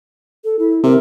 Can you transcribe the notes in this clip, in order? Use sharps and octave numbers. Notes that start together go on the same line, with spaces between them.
A4
E4
C3 A#4